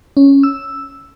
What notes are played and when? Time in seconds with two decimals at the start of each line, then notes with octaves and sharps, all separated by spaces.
0.17 C#4
0.43 E6